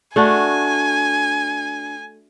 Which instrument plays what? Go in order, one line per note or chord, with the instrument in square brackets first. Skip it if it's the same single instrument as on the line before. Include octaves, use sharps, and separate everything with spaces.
[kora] A3 D4 F#4 [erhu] G#5